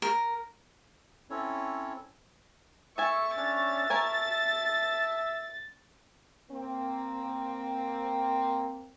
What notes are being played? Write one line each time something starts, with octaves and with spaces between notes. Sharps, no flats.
A#4
C4 C#4 E4 A4 C#5
A4 E5 G#5 C#6
C#4 D4 C#5 A6
A#4 C#5 G#5 A5
A#3 C4